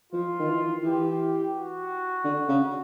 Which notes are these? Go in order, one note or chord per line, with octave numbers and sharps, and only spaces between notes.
F3 F4
D#3
E3
E3 G4
F#4
D3
C#3